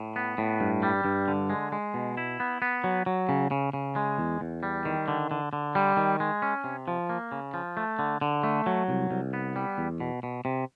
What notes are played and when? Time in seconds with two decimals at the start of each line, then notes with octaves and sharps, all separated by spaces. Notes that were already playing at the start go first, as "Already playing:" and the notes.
Already playing: A2
0.16 B3
0.38 A2
0.60 G2
0.83 G3
1.05 G2
1.28 D3
1.50 G#3
1.72 G#3
1.94 B2
2.17 E4
2.40 B3
2.62 B3
2.84 F#3
3.06 F#3
3.29 C#3
3.51 C#3
3.73 C#3
3.96 G#3
4.18 E2
4.41 E2
4.63 G3
4.85 D#3
5.08 D3
5.31 D3
5.53 D3
5.75 G3
5.97 D#3
6.20 G#3
6.42 C#4
6.64 C3
6.88 F3
7.09 A#3
7.32 C#3
7.54 F3
7.77 A3
7.99 D3
8.21 D3
8.44 A3
8.66 F#3
8.88 C2
9.11 C2
9.33 B3
9.56 G3
9.78 E2
10.00 B2
10.23 B2
10.45 C3